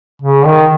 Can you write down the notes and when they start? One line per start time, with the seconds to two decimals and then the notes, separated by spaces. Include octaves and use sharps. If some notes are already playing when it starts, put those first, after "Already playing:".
0.22 C#3
0.45 D#3